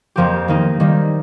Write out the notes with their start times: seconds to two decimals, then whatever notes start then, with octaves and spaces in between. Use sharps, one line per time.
0.16 F2 F3 A#3 G4
0.48 D#3 A#3 D#4
0.80 D#3 G3 A#3